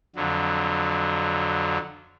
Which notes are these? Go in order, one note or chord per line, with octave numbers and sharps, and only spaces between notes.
F2 D3 F#3